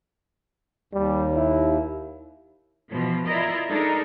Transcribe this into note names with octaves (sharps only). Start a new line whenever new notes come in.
D#2 G3
E4
B2 E3 F3
E4 F4 A#4 D5 D#5
G#3 D4 D#4 A4 A#4